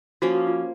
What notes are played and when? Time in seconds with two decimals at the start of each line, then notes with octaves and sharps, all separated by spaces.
0.22 F3 A#3 C#4 F#4
0.34 F#4
0.47 F4